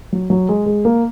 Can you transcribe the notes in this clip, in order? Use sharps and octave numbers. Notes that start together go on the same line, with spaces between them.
F#3
F#3
G#3
G#3
A#3